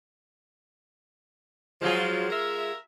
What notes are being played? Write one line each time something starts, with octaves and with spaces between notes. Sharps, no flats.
F3 F#3 G#3 F4 G#4
A#4 E5